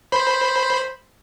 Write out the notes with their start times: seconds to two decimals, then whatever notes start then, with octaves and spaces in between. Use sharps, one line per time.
0.12 C5 B5